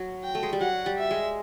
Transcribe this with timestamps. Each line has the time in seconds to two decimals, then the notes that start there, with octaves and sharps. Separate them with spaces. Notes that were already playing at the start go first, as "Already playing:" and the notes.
Already playing: F#3
0.24 G5
0.35 A3
0.43 G#3
0.53 G3
0.60 F#3 F#5
0.86 G3
0.98 E5
1.11 G#3